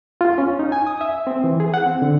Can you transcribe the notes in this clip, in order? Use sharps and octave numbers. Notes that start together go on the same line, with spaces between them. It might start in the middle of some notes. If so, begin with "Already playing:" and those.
F4
C#4
D#4
G#5
D#6
E5
C4
E3
G#4
F#5
C4
D3